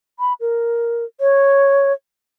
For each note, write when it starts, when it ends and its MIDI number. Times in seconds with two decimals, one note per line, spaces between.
0.19 0.33 83
0.41 1.04 70
1.20 1.92 73